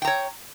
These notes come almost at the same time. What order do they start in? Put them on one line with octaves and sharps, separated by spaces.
G5 A#5 C#5